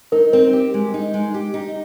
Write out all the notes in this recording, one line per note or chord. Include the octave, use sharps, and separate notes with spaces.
D#4 A#4
C4 A#4
G4
G#3
D#4
G#3
G4
D#4